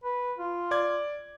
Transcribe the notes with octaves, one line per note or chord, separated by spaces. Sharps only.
B4
F4
D5 D6 G#6